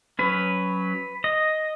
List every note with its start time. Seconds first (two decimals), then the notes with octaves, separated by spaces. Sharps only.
0.19 F#3 C#4 B4
1.24 D#5